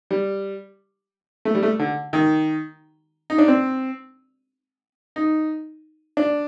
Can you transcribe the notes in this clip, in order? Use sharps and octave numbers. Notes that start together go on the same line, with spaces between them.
G3
A3
G3
A3
D3
D#3
D#4
D4
C4
D#4
D4